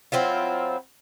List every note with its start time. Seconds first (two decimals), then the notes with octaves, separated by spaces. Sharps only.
0.12 F#3 C4 E4 F4